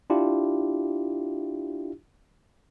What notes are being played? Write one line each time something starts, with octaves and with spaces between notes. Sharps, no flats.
D4 E4 F4 G4